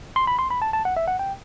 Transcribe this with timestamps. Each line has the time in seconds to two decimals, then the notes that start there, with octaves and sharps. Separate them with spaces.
0.16 C6
0.27 B5
0.39 C6
0.51 B5
0.62 A5
0.73 A5
0.85 F#5
0.97 E5
1.08 F#5
1.19 G5